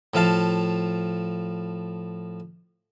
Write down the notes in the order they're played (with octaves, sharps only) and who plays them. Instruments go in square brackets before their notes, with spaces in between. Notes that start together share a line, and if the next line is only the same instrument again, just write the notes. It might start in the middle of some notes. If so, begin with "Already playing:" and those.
[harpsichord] A2 F3 F5 A5